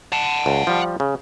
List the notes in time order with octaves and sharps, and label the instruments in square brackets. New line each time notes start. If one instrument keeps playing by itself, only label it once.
[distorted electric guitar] F#5 A5
[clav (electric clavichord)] C#2
F3 G3
C#3